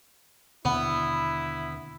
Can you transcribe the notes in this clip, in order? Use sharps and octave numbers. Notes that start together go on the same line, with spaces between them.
D#2 B2 D3 B3 E4